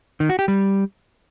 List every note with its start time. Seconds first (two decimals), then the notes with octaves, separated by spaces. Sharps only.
0.20 D#3
0.29 F#4
0.39 G4
0.48 G3